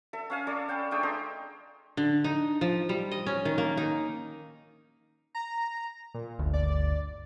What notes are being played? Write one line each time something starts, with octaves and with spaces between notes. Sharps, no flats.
A4 E5
C#4 F5 G#5
C#4 A4 D5
F5 G5 A5 B5
A3 D4 G#4 G5
D#5 E5 A#5 C6
D3
D#4
F3
G3
D#5
C#4
D#3
A#3
D#4
A#5
A#2
G1 D2
D5